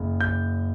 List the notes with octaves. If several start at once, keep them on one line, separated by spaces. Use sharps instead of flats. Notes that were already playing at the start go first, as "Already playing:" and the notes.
Already playing: F#1 F#2
G6